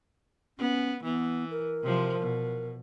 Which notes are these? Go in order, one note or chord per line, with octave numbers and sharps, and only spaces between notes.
B3 C#4
E3 B3
A#4
C3 F3
B2